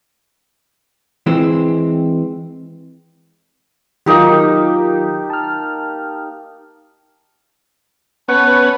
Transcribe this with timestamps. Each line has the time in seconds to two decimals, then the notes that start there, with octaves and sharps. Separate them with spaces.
1.26 E3 G#3 C4
4.06 D#3 F#3 A#3 D#4 F4 G4
5.30 A5 F6
8.28 B3 C#4 B4 F#5 A5